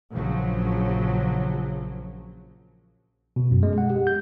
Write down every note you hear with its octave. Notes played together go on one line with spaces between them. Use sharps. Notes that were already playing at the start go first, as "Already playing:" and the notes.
A#1 C#3 F3 F#3
B2
F#2
G#3
F#5
G4
G6